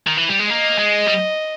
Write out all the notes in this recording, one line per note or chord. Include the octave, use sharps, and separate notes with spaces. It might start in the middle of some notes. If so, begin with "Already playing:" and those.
D#3
E3
G3
G#3
A#3 D#5
G#3
G3